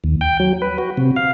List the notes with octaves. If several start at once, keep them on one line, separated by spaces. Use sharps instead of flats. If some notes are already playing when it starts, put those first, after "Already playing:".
D#2
G5
F#3
B4
F#4
C3
F5